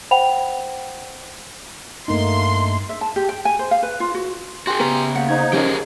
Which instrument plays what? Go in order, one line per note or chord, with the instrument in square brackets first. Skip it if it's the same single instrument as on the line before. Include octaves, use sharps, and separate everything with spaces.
[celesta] C5 F#5 G5 B5 F7
[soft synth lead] G2 [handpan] A3 A#3 D#4 [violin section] C6
[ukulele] E5
A5
G4
G5
G#5
C5
F5
B4
F4
F#4
[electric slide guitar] F#4 G#4 [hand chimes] G5 G#5 C6
[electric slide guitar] C#3 A#5 [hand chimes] B3 [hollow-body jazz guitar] G4 B4
[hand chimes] A#3 F5 [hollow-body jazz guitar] F#5
[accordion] D#4 [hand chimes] C5 G#6
[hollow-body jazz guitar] F3 C#4 [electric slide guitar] G4 G#4 A#4